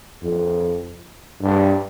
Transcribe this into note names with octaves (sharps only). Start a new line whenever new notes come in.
F2
G2